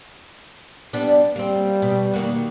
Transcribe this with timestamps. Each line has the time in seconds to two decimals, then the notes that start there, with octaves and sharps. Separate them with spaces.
0.93 G3 B3 D4
1.36 G3 A#3 C4
1.82 B2
2.14 D#3 A#3 F#4